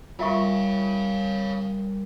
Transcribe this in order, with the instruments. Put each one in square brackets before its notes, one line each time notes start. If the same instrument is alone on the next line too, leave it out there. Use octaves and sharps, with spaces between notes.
[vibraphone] G3 A#4 [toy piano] F4 E5 C#6 [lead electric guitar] C#5 F5